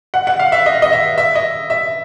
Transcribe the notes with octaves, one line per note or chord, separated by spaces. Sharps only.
F#5
F#5
F5
E5
D#5
D#5
E5
E5
D#5
E5